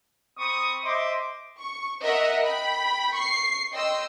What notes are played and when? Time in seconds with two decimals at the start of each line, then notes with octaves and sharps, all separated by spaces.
0.38 C4 B5 C#6 D#6
0.84 C5 D#5 E5 C6 D6
1.59 C#6
2.01 A#4 D#5 E5 F#5
2.43 G5 B5
3.15 C#6 C7
3.72 D#5 G5 C6 E6